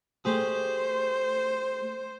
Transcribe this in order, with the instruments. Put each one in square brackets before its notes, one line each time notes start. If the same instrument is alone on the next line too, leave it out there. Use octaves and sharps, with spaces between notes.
[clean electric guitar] A3 G4 G#4 [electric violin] C5